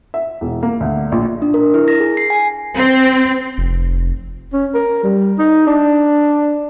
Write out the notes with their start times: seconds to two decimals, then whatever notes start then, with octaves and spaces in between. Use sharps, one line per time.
0.14 E5
0.41 E1
0.63 A#3
0.80 D2
1.12 A#1
1.42 D4
1.54 A#4
1.74 E4
1.88 A#6
2.00 G#4
2.17 C7
2.30 G#5
2.77 C4
3.58 F1
4.53 C#4
4.74 A#4
5.03 G3
5.39 D#4
5.67 D4